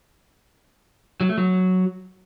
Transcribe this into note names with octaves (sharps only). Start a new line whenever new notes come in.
F#3
A3
F#3